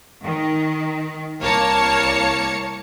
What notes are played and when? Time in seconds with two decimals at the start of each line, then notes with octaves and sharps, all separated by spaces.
0.23 D#3
1.41 C2 A#3 C#5 A5 C#7